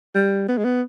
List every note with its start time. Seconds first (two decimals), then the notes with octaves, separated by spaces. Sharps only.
0.15 G3
0.48 B3
0.58 G#3
0.65 B3